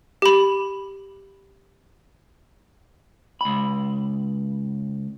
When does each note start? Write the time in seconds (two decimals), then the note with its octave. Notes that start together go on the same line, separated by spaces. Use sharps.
0.22 G4 B5
3.41 C#2 B5